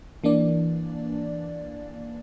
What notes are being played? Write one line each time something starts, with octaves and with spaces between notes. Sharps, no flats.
E3 A#3 D4 D5